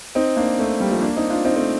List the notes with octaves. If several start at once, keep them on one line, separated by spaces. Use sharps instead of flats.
C4 D#4
A#3 D4
A3 C4
G3 A#3
F3 A3
A#3 D4
C4 D#4
D4 F4
C4 D#4
A3 C4